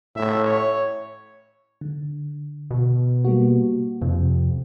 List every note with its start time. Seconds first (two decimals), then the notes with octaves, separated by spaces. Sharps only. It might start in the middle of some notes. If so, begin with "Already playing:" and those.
0.16 A2 E5
0.45 C#5
1.81 D3
2.71 B2
3.25 G3 A#3 F#4
4.02 F2 C3